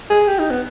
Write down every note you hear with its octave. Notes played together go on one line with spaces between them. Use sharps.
G#4
G4
D#4
B3